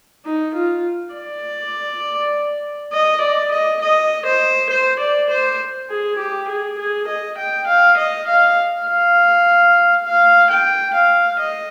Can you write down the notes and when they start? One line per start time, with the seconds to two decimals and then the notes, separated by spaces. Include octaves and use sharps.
0.25 D#4
0.55 F4
1.14 D5
2.93 D#5
3.21 D5
3.52 D#5
3.82 D#5
4.26 C5
4.70 C5
5.00 D5
5.31 C5
5.90 G#4
6.19 G4
6.49 G#4
6.79 G#4
7.08 D#5
7.38 G5
7.68 F5
7.98 D#5
8.28 F5
8.87 F5
10.06 F5
10.51 G5
10.95 F5
11.40 D#5